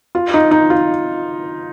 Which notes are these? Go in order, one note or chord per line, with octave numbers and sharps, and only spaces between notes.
F4
D#4
D#4
F4